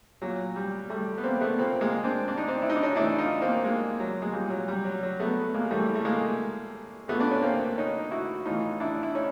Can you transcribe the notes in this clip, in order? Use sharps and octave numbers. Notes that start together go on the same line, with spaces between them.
A#2 F#3
G3
G3 A3
B3
A#3 C4
A3 B3
A#2 A#3 C4
G#3 A#3
C4 D4
D4
D#4
C4 D4
E4
D#4
D4
C#4 D#4
A2 E3 D4 E4
D#4 F4
A#3 C4
G#3 A#3
F#3
G#3
A#2 G3
F#3
G3
F#3
F#3
A3 B3
G#3 A#3
A2 E3 G3 A3
A3
G#3 A#3
A#2 A3 B3
D4
C#4
A#3 C4
C#4 D#4
E4 F#4
A2 E3 D#4 F4
D4 E4
E4
C#4 D#4